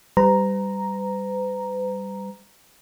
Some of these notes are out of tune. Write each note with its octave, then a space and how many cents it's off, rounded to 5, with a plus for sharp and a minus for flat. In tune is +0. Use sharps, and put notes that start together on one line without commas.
G3 +0 B4 +45 A#5 +0